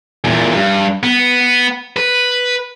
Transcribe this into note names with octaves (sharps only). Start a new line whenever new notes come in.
E2 A#2
G2
B3
B4